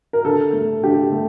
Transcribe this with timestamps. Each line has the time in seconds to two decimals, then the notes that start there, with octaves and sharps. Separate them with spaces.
0.13 A#4
0.25 D3 A4
0.53 A3
0.83 D3 G4
1.12 A3